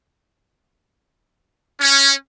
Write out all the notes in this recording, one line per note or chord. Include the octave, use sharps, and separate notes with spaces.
C#4